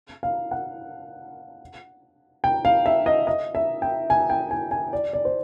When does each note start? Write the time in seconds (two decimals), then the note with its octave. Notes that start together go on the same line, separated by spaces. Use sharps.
0.23 F5
0.51 F#5
2.44 G5
2.65 F5
2.86 E5
3.06 D#5
3.27 D#5
3.55 E5
3.82 G5
4.10 G#5
4.30 G5
4.51 G#5
4.71 G#5
4.93 D5
5.13 D5
5.25 C5